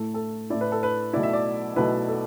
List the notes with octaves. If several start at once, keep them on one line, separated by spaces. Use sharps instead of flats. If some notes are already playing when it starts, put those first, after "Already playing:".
Already playing: A2 A3 E4 A4
A4
A2 A3 E4 D5
B4
A4
B4
B1 B2 A3 E4 D5
E5
D5
B1 B2 A3 E4 B4
A4